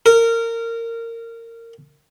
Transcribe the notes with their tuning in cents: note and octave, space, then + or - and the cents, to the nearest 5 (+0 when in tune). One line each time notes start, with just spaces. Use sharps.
A#4 -20